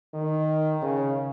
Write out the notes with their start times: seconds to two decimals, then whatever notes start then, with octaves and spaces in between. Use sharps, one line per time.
0.14 D#3
0.82 C#3